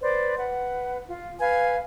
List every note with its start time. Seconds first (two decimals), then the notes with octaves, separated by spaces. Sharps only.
0.01 B4 C5 D5
0.37 B4 F#5
1.09 F4
1.39 B4 F5 G#5